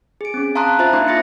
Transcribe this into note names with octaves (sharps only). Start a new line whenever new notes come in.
G#4 D7
C4 C#4
F5 A5 A#5 C6 D#6 F#6
F4 C5 E5 B5 F#6 A6
A#3 D4 D#4 F5 C6 D6
F4 E5 A6 A#6 C#7